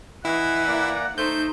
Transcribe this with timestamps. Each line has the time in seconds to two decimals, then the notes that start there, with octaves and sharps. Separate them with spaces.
0.25 E3 E4 D#5 F#5
0.67 A#3 D5 A#5
1.18 A3 D#4 C5 G6